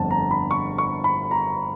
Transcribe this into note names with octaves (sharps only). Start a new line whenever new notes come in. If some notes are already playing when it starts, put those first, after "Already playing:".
Already playing: G1 F2 D3 A5
A#5
B5
C#6
C#6
B5
A#5